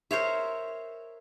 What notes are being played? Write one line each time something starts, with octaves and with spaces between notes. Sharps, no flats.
A#4 C5 C#5 E5